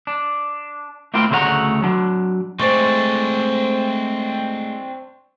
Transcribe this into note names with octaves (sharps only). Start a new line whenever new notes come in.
D4
A3 A#3 C4 E4 F4 G5
D2 C#3 A3 C5 F#5 A#5
F#3 D4
G#3 A3 C4 D4 C5 D5 C#6